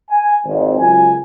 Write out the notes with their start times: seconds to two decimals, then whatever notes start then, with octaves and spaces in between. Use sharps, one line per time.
0.11 G#5
0.46 G#1 F2
0.80 C#2 F#2 F4 G#5